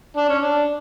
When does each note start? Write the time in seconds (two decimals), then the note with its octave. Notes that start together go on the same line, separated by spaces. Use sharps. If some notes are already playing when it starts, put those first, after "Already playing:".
0.17 D4
0.29 C#4
0.41 D4